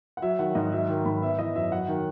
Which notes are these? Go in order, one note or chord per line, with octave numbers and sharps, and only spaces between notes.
F#5
F#3 E5
D#3 F#5
G#2 D#5
F#3 E5
D#3
G#2 B5
B3 E5
E3 D#5
F#2 E5
F#3 F#5
D#3